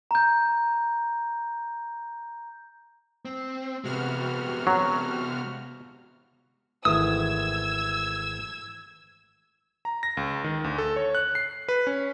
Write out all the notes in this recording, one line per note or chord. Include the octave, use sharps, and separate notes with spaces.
A#5 G6
C4
C3 G#3 B3 F#4 F6
F#3
G#1 E3 A3 D#6 E6 G#6
A#5
A#6
C#2
D#3
D2
A4
C#5
F#6
C7
B4
C#4